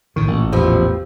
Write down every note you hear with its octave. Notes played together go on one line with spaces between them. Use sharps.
A#1 A2 D#3 C#6
A1 A#2
E2 B2 F3 B3 G4 E6